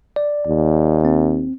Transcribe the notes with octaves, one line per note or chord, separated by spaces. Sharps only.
D5
D#2
C4